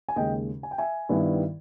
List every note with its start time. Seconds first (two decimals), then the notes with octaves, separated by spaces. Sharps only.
0.09 G#5
0.16 D#2 C#3 G#3 D#5 G5
0.63 G#5
0.71 G5
0.78 E5 G#5
1.09 G2 D#3 G3 B3 E4